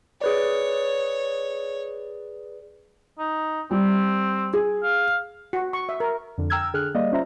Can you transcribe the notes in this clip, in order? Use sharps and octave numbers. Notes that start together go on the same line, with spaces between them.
G#4 B4 C#5 D5
D#4
G3 C4
G#4
F5
F#4
C#6
E5
A#4
F2 D3
G5 A#5 E6 F6 G#6
D3 G#4 F6 F#6
G3 A#3 D5 D#5 F5
C#4 F4 C5 E5 A#5